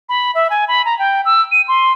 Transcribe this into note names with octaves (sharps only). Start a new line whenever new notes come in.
B5
E5
G#5
B5
A#5
G5
E6
D#7
C6